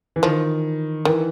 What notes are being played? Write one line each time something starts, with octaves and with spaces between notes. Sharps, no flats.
E3
D#3 F3
D#3 E3